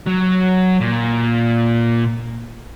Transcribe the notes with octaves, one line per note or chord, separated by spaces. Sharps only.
F#3
A#2